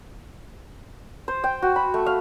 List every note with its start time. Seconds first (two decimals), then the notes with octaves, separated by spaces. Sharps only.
1.28 C5
1.44 G5
1.62 F#4
1.76 B5
1.94 A3
2.06 F5